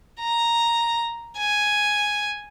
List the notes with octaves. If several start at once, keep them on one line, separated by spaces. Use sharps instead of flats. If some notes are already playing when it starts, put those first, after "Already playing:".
A#5
G#5